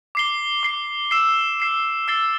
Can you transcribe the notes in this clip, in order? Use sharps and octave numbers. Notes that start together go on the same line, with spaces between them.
D6 C7 G7
D6 C7 G7
E6 C7 E7
E6 C7 E7
E6 A6 C7 G7